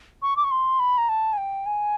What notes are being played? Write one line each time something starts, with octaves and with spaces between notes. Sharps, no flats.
C#6
D6
C#6
C6
B5
A#5
A5
G#5
G5
G#5